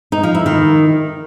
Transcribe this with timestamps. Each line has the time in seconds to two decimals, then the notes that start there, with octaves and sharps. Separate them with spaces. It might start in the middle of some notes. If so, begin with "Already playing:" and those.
0.12 D#4
0.23 F3
0.35 E4
0.46 D#3